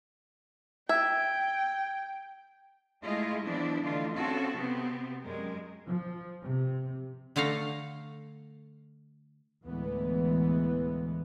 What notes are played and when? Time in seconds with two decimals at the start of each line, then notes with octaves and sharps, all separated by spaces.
0.89 E5 G5 G#6
3.03 G#3 A3 E4 F4 G#4 D#5
3.45 E3 F3 B3 D4 E4
3.83 D3 E3 A3 D4 D#4 F4
4.14 C4 C#4 F4 F#4 G#4 A4
4.54 C3 B3 C4
5.23 F#2 G3 G#3 A#4
5.87 F3
6.42 C3
7.36 D3 A3 A4 F5 A#5
9.64 D2 A2 E3 G#3 B3